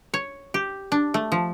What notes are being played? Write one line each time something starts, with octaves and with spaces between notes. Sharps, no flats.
C#5
G4
D4
A3
F3